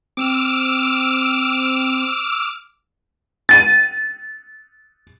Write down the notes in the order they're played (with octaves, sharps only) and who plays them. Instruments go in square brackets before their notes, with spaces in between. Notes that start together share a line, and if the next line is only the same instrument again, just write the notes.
[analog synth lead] C4 [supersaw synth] D6 E6 F6
[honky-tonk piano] A6 D#7